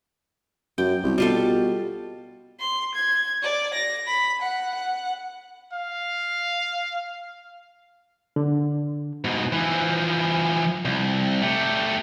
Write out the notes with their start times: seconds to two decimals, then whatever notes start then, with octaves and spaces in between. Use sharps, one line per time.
0.78 F#2 G5
1.03 C2
1.18 B2 G3 F4 A4
2.60 C6
2.95 G#6
3.42 D5
3.74 A#6
4.07 B5
4.42 F#5
4.75 F#5
5.73 F5
8.36 D3
9.24 G#2 B2
9.52 E3 F3
10.85 C2
11.42 A3 G4